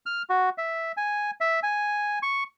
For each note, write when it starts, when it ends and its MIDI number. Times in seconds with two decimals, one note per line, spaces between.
0.06 0.22 89
0.30 0.50 66
0.58 0.92 76
0.97 1.31 80
1.41 1.60 76
1.63 2.19 80
2.23 2.44 85